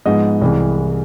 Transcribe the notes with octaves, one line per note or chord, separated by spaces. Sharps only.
G#2 F3 G#3 B3 D#5
C2 C3 E3 G#3